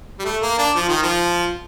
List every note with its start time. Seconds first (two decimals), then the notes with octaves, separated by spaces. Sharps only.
0.19 G3
0.25 A3
0.42 A#3
0.58 D4
0.75 F3
0.89 D#3
1.03 F3